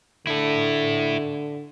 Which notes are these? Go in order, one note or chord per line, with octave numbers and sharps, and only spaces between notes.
D3 E4 A4